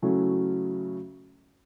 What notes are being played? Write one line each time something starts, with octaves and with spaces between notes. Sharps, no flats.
C#3 F#3 A3 C#4 E4